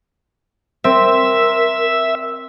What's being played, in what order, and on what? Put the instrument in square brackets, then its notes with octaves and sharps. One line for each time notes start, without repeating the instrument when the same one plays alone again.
[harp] C4 [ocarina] A#4 [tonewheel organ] E5